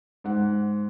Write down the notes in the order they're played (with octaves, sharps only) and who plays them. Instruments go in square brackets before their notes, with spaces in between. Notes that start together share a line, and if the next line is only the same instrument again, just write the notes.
[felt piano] G#2 F#5